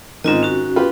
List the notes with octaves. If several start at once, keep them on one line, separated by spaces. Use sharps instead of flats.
G#2 D#3 C4 F4 D#5
C#4 F#4
F4 G4 B4